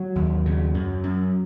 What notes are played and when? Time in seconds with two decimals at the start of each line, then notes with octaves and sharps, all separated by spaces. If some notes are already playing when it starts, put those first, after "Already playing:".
Already playing: F#3
0.16 D#2
0.46 C#3
0.74 F#2
1.04 F#2